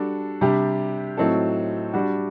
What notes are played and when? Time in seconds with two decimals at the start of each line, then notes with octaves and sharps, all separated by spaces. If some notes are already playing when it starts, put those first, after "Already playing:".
Already playing: G3 D4 F#4 A4
0.41 C3 G3 D4 G4
1.17 A2 F#3 C4 D#4 A4
1.93 G3 D4 F#4